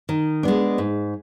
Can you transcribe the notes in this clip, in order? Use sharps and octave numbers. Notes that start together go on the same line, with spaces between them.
D#3
G#3 B3 D4
G#2